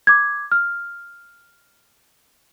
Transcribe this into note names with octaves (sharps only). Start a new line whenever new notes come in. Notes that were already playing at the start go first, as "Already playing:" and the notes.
D6 G#6
F6